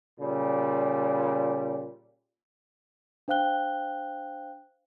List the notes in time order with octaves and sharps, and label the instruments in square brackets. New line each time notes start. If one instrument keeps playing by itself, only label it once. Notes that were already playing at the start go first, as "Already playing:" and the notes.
[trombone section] A#2 C#3 G3
[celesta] D4 C5 F5 G5 F#6 G7